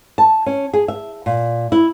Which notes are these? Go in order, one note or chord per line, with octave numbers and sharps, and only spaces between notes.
A5
C#4
G#4
E5
A#2
E4